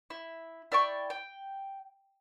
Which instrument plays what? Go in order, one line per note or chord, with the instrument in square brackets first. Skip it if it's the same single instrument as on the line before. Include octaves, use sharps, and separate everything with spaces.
[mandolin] E4
E4 D5 G5 C#6
G5